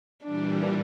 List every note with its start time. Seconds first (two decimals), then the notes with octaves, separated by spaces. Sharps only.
0.24 A#2 E3 G3 D4